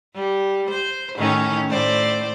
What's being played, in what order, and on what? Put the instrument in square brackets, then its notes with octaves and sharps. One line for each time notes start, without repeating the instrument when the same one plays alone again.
[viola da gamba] G3
C5
A2 D#3 C#4
A2 C5 D5